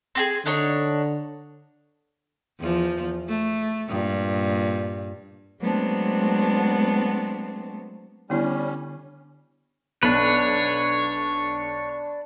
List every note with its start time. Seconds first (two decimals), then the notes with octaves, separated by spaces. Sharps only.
0.15 C4 G4 G#4
0.46 D3 D4 D#4 C#5
2.60 E2 F3
3.28 A3
3.89 G2 A#2
5.60 F#3 G#3 A3 B3 C4 D4
8.30 D3 G3 B3 C#4 E4
10.03 B1 D4 B4 C#5